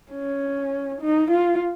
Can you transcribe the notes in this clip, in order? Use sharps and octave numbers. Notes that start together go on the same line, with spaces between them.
C#4
D#4
F4